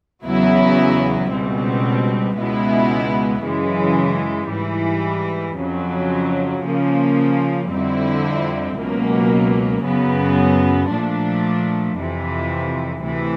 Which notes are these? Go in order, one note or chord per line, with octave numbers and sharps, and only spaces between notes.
E2 C#3 F#3 B3 E4
C#2 B2 G3 C4
C#2 B2 G#3 B3 E4
F#2 C#3 E3 G#3
G#2 E3 G3
F2 C#3 F#3
C#3 F3 A#3
F2 D3 G3 C4 E4
C#2 B2 F#3 A#3
F#2 C#3 F#3 B3
A#2 F3 A3 D4
F2 C3 E3
D2 C3 E3